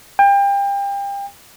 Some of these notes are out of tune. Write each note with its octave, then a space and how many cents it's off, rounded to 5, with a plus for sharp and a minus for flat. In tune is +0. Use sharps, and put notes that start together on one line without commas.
G5 +30